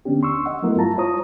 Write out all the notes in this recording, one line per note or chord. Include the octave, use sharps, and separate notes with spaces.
D3 B3 C#4 D4 G4
D#2 C6 C#6 E6
D#5 F#5
F#3 A3 B3 E4 A#4
G2 G3 E4 F4 A5 A#5
F4 C5 C#5 A#5 D#6